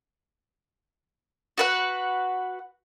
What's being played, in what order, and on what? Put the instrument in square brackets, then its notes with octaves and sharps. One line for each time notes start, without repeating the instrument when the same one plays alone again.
[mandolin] F#4 B4 F#5